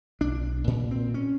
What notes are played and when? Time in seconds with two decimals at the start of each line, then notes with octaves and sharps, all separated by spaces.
0.21 B1 D4
0.67 A#2
0.91 C4
1.14 C#4